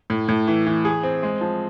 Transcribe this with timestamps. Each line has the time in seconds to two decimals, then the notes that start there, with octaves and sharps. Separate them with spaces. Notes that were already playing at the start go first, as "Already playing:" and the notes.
0.10 A2
0.28 A2
0.48 E3
0.67 E3
0.85 G#4
1.03 C4
1.23 G#3
1.41 F3